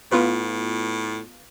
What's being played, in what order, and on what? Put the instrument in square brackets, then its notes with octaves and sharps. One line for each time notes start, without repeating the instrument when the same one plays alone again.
[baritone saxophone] A2 [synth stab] B3 F4 B4